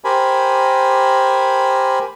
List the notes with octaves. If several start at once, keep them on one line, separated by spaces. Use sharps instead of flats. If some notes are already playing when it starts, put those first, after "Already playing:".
G4 A#4 C5 G#5 B5